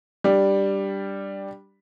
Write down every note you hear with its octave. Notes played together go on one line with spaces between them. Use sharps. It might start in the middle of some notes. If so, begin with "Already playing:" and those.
G3 D4